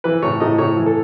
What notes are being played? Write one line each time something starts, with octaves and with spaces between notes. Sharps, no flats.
E3 B4
A2 C#5
A2 D#5
A2 C#5
E3
A4